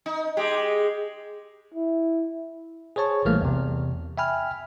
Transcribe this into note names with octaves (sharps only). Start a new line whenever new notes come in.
D#4
G#3 G4
E4
G#4 C5 C#5 A5 C#6
A#1 E3 G3 A3 A#3 F6
E2 C3
E5 G5 G#5 B5 F6